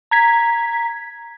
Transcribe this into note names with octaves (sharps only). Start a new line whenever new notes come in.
A#5 G#6 B6